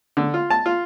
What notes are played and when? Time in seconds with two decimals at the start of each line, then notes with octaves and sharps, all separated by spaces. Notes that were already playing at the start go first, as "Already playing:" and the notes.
0.17 D3
0.34 F4
0.50 A5
0.66 F4